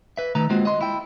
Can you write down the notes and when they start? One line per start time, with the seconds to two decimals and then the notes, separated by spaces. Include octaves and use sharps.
0.17 B4 E5
0.35 D#3 A3 B4 A#5
0.50 G#3 A#3 C4 F4 F#4
0.65 D#5 C6
0.81 E4 G5